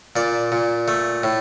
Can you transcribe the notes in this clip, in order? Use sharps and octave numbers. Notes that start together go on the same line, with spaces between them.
A#2 D5
A#2
A3
A2